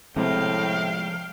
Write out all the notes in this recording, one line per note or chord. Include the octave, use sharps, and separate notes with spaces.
A2 C3 F3 G#3 F5 G5